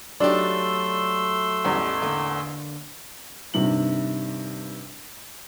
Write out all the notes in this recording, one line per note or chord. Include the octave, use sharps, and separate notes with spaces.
F#3 A3 D4 D#4 G4 D5 C6 E6
A1 E2 G3
D3 A#3 G#5
G2 C3 D#3 F#7